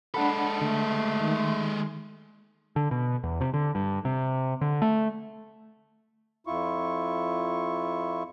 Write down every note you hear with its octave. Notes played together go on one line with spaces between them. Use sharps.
G#3 D4 A4 F#5 B5
D3 A3
D#3
D3
B2
E2
C3
D3
G2
C3
D3
A3
F2 E4 F4 C#6